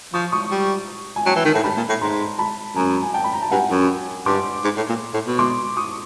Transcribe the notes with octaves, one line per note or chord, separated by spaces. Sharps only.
F3 C#6 D#6
C#6 D#6
G3
G#5
F#3 G5 A5
E3
D#3
A2
G2 A5 B5
A#2
A2
G#2 A#5 C6
A5 B5
F#2 G#5 A#5
G#5
G5 A5
B5
A#5
A5
G2 F#5 G#5
F#2
G2 C6 D6
G#2
A2
A#2
A2
B2
C6 D6
C#6 D#6